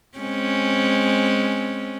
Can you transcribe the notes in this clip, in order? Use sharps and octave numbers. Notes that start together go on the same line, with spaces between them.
G#3 C4 C#4